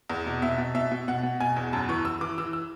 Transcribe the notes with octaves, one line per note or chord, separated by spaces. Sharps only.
E2
B2
B2 E5
B2
B2 E5
B2
B2 F#5
B2
B2 G#5
E2
F#2 A5
E3 C#6
E3 E6
E3 D6
E3 E6
E6